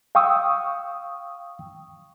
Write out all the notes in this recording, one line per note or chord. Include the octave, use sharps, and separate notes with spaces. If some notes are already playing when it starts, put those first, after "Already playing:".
F5 G5 C#6 D#6 E6